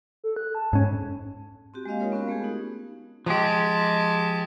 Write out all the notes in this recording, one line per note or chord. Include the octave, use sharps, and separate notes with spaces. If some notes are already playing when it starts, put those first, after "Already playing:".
A4
F#6
A5
G#2 C#4
C4 F#4 G4
G#3 A#3 C4 D#5 F5
G#3 D#4 F4 A#4 C#5 F5
B3 C#4 F4 F#4 A#4
G#3 A3 B3 G4 G#4
D#4 F#4
F3 G#3 G4 A5